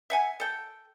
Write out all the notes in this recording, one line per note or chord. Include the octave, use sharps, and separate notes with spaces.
E5 F#5 G#5
A4 G5